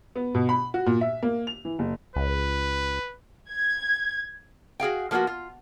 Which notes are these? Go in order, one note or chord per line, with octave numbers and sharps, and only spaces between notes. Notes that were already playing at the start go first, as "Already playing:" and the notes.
B3
B2
B5
F#4
A#2
E5
A#3
F7
E3
F#1
C#2 B4
G#6
F#4 G#4 F5 G5
F3 A#3 B3 D#4 F#4
F4